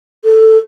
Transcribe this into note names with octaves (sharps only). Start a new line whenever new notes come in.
A4